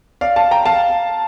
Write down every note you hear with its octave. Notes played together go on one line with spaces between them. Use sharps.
D5 F5
F5 A5
G5 A#5
F5 A5